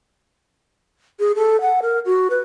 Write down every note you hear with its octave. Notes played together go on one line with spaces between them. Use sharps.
G#4
A4
F#5
A#4
F#4
B4